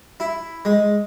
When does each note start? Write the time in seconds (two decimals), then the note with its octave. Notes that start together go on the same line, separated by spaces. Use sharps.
0.20 E4
0.65 G#3